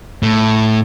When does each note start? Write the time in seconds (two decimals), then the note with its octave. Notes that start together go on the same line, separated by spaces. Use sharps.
0.23 A2